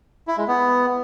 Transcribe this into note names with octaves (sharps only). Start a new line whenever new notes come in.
E4
G#3
B3